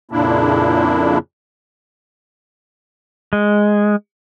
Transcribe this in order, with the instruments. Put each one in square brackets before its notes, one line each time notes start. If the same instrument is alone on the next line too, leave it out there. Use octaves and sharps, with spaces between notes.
[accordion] F2 A#2 C#3 A#3 D4 E4
[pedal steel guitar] G#3